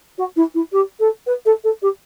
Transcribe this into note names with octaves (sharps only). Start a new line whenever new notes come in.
F#4
E4
E4
G4
A4
B4
A4
A4
G4